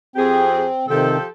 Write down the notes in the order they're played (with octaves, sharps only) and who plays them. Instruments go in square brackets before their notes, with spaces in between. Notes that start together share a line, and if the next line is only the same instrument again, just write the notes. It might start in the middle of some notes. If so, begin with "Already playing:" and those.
[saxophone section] F2 G4 G#4 [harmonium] C4
[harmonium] C3 D#3 [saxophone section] F3 G4 A4